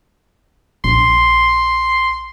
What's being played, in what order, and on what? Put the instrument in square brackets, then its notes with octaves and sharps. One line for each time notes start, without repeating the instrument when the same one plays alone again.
[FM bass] A#1 [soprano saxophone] C6